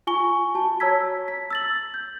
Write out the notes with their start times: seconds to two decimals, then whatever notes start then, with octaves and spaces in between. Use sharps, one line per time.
0.07 F4 G#5 C#6 G7
0.55 F#4 A5
0.80 C#5 A5 A#5 E6 G#6 B6
1.28 B6
1.50 E6 A6 F#7
1.94 G6